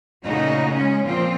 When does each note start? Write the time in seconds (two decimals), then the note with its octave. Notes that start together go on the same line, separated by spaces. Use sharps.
0.22 A#2 C#3 A3 D#4 F#4
0.73 G#3 C#4
1.05 A#2 F3 C4 F4